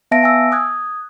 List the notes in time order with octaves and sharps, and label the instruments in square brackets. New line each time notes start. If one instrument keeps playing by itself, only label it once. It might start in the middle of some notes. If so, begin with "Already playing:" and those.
[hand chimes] B3 E5 F5 A5 A#6 D7
G#5 E6
D#6 F#6 G#6